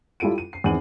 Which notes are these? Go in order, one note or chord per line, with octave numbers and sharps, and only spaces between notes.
G3 E4 F4 A4 D7 D#7
D#7
C7
E2 D#3 C4 G#4 D#7 F#7